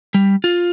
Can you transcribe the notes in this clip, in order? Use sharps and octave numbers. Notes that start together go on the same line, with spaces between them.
G3
F4